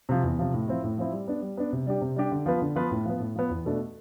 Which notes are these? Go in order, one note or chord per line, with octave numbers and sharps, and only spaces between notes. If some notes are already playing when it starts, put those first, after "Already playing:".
C3 F3
E2
C3 F3
A2
F3 C4 E4
A2
F3 C4 E4
G3
B3 D4
G3
B3 D4
C3
G3 D4 G4
C3
G3 D4 G4
D3
F3 B3 F4 B4
D3
F3 B3 F4 B4
A2
F3 B3
A2
F3 B3
E2
B2 A3 D4